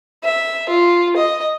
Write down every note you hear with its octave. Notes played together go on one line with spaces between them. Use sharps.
E5
F4
D#5